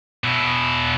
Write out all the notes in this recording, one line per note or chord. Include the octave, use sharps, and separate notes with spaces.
B2 E4